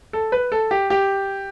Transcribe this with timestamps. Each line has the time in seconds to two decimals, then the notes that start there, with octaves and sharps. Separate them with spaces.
0.13 A4
0.32 B4
0.52 A4
0.71 G4
0.90 G4